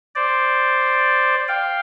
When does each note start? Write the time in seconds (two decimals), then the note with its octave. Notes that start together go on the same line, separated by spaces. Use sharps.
0.15 C5 D5
1.48 F5 G5